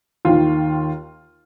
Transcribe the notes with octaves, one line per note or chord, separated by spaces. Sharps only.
D#2 D#3 F4